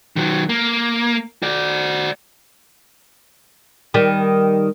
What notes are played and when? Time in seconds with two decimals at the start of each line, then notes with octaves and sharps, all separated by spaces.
0.16 D#3 F#3
0.49 A#3
1.42 F#4 D5
3.94 D#3 G3